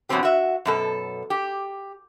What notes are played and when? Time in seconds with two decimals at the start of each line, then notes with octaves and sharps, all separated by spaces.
0.09 E2 B2 F#3 G3 C4 G4
0.23 F#4 E5
0.65 F#2 B2 A4
1.30 G4